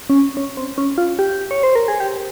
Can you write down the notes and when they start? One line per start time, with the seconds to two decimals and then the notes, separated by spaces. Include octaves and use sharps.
0.10 C#4
0.37 C#4
0.57 C4
0.78 C#4
0.98 F4
1.19 G4
1.51 C#5
1.63 C5
1.75 A#4
1.88 G#4
2.00 G4